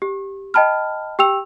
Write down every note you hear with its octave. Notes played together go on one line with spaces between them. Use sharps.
G4
D#5 G5 A5 B5 F6
G4 G5 E6 F7